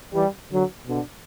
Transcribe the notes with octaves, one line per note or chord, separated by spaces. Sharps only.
E3 G3
D3 F#3
B2 D3